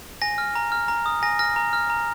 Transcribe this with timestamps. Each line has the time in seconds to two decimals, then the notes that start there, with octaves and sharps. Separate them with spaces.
0.22 G#5 A#6
0.38 F6
0.55 A#5
0.72 F6
0.88 A#5
1.06 D#6
1.23 G#5 A#6
1.39 F6 A#6
1.56 A#5
1.73 F6
1.90 A#5